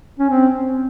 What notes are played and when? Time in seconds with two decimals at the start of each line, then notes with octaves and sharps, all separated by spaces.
0.19 C#4
0.30 C4